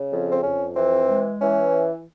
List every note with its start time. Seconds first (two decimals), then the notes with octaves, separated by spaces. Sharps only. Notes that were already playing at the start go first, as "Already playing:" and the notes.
Already playing: C#3
0.11 F2
0.32 C4
0.43 F2 C#4
0.76 E3 C4
1.08 G#3
1.41 E3 C#4